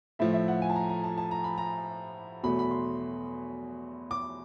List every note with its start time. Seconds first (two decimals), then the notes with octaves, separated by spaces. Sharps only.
0.19 A2 F3 A3 E5
0.33 E5
0.48 F#5
0.62 G#5
0.70 A5
0.76 A#5
0.89 A#5
1.04 A5
1.18 A5
1.31 A#5
1.44 B5
1.58 A#5
2.43 E2 B2 F#3 A3 B5
2.59 B5
2.71 C6
4.11 D6